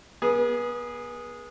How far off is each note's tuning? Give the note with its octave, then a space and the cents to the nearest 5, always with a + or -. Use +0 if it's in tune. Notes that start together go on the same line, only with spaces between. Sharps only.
B3 -35 G#4 +0